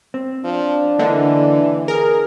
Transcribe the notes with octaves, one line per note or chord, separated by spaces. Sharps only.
C4
F3 D4
D3 E3 A#3 D#5
G#4 A#4